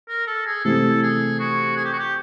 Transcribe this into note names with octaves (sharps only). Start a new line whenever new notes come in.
A#4
A4
G#4
C3 E3 A3 A4
G#4
F#4
G#4
G4
F#4
G4